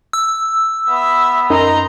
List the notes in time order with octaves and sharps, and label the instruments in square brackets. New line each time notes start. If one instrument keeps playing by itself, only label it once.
[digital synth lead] E6
[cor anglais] B3 [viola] E5
[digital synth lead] F#2 [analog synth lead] D#4 [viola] A#5 C6